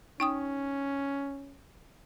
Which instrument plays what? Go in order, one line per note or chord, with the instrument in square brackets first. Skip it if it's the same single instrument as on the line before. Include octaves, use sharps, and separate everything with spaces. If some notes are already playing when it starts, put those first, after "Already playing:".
[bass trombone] C#4 [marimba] D#4 G5 D#6